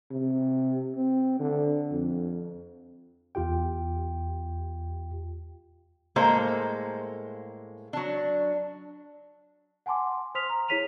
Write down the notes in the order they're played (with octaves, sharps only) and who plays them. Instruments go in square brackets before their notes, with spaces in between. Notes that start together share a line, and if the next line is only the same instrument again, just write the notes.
[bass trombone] C3
C4
D3
F2
[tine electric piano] E2 F4 G4 G5
[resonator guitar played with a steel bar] A2 G#3 A#3 A4 C5 A#5
F#3 D4
[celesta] F#5 G#5 A5 C6 D6
C5 C6 D#6 F6 B6 F7
A#5
E4 G#4 C#5 B6 D#7 F7